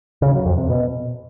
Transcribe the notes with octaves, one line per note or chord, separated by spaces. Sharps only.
C#3
F#3
F2
C3
B2